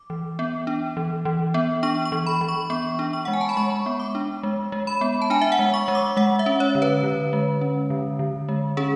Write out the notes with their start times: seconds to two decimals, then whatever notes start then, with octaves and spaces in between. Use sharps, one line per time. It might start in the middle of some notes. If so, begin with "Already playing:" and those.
Already playing: D6
0.10 E3
0.39 B3
0.67 D4
0.97 E3
1.25 E3
1.54 B3
1.83 D4 C#6
2.05 C#6
2.12 E3
2.26 B5
2.41 E3
2.48 C#6
2.70 B3 C#6
2.99 D4
3.13 C#6
3.25 G#3 F#5
3.33 G#5
3.41 A5
3.49 B5
3.57 G#3 C#6
3.86 B3
4.00 D6
4.15 D4
4.43 G#3
4.72 G#3
4.87 B5
5.01 B3
5.22 A5
5.30 D4 G#5
5.41 E5
5.52 F#5
5.59 G#3
5.74 C#6
5.88 G#3
5.95 D6
6.17 G#3 F#5
6.39 E5
6.46 C#4
6.60 C#5
6.75 D3
6.82 B4
7.03 D3
7.33 G#3
7.61 C#4
7.90 D3
8.19 D3
8.49 G#3
8.77 C#4 G#4